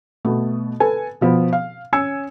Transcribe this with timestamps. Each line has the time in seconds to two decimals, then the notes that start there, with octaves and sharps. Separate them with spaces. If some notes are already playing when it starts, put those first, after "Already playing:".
0.25 B2 A3 B3
0.80 A4 B4 G#5
1.21 B2 F3 B3
1.53 F5
1.93 C#4 G#5 E6 G#6 C#7